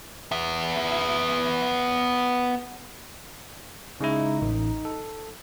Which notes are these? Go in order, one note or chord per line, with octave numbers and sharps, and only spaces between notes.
B3 E5
C#3 G#3 D#4 E4
A1
A4